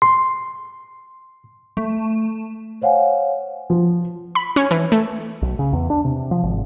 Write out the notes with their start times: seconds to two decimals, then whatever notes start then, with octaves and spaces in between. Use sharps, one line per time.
0.02 C6
1.77 A3
2.82 C5 C#5 F5 F#5 G#5
3.70 F3
4.35 B5
4.56 C#4
4.71 E3
4.92 A3
5.42 B1
5.59 C#3
5.73 E2
5.90 D4
6.05 C3
6.31 F3
6.43 G#1